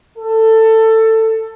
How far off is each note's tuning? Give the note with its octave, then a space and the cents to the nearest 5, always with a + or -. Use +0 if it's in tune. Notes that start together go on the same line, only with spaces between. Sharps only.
A4 +15